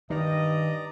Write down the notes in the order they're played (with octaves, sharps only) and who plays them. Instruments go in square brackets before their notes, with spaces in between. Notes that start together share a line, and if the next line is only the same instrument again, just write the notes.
[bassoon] G2 [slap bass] D#3 [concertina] D5 A#5 [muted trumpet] D#5